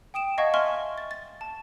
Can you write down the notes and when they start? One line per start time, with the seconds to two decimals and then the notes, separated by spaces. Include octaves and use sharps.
0.14 G5 D#6 D7 E7
0.38 D#5 F5 F#5 A5 C#6 G#6
0.54 E5 F5 G#5 C6 C#6 F6
0.98 A6
1.11 A6
1.41 A5